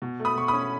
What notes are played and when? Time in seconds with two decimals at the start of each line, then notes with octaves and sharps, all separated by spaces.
0.02 B2
0.20 A3
0.25 B5 D#6
0.36 B2 C#6
0.48 C#4 B5 D#6